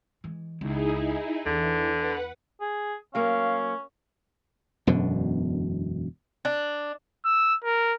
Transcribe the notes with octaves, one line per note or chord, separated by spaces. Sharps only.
E3 G#3
C#2 D#4 E4 G#4
E2 D3 E3
B4 F#5
G#4
F#3 A#3 C#4 F5
E1 F#2 B2 D3
D4
E6
A#4